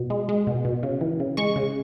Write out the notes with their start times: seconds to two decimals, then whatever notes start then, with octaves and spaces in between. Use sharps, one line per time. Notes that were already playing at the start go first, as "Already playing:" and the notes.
Already playing: B2
0.10 G#3
0.29 G#3
0.47 B2
0.65 B2
0.83 C#3
1.01 E3
1.20 C#3
1.37 G#3 C#6
1.56 C#3